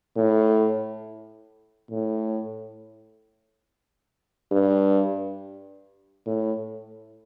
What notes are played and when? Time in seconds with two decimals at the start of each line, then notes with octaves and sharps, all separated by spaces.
0.17 A2
1.91 A2
4.52 G2
6.26 A2